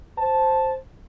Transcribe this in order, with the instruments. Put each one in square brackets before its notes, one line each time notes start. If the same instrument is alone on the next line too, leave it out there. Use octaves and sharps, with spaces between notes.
[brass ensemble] C5 A5